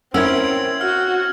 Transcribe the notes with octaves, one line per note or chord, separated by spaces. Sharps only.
C4 C#4 E4 A#4 F#5 E6 G#6
F#4 F6